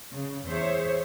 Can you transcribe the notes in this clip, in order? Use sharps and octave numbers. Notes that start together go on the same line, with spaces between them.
C#3
E2 G#4 C5 C#5 E5